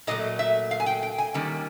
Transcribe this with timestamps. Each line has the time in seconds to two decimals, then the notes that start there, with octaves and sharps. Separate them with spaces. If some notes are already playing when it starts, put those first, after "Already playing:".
0.07 A#2 F#3 A3 D#5
0.39 E5
0.71 F5
0.80 G#5
0.86 G5
1.03 G5
1.18 G#5
1.34 D#3 G3 A#3 C#4